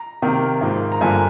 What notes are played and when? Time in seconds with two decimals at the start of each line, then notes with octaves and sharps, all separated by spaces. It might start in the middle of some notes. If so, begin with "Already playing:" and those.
Already playing: A#5
0.22 C3 D#3 A#3
0.61 G#2 F3 A#3
0.92 A#5
1.01 G2 D3 F3 A#3 G#5